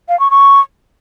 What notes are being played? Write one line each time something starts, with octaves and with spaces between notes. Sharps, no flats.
F5
C#6
C#6